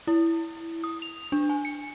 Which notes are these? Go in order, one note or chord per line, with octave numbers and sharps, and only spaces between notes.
E4
D#6
F7
D4
G#5
C#7